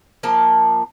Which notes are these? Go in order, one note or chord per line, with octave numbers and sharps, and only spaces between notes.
F3 A#3 A5